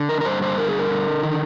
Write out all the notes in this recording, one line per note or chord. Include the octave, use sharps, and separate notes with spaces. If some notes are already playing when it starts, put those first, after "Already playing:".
Already playing: D3
A#4
A#4
G2 C5
C5
D3 A#4
G#4
A#4
D3
D#3